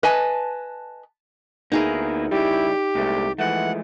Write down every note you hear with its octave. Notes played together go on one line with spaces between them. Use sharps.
B4 D#5 G#5 A5
D2 A#3 B3 D#4 E4 G#4 A#4
C#3 G3 E4 G4
C2 A#2 G#3 A3
E3 F3 G#3 A3 F#5